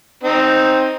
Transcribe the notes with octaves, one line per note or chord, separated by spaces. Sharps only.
C4 D#4